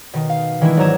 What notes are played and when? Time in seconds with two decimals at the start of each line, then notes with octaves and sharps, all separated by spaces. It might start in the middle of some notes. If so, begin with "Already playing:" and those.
0.13 B2 D#3
0.30 F5
0.61 D#3 E3 G#3 A3 D4 E4
0.77 G#1 F#3 D5 A#5 G#6 E7